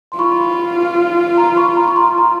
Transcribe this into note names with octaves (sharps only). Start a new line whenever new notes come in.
C6
F4 B5 C#6
A#5 C6
B5 C#6
A#5 C6
C#6
A#5 C6
A#5